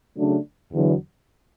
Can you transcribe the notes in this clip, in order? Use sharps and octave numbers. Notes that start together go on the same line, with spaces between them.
C#3 F#3 A3 D4
E2 D3 F#3